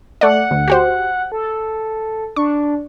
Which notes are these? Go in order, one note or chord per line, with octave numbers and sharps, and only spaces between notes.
A3 D5 F#5
D2
F#4 G4 C5
A4
D4 C#6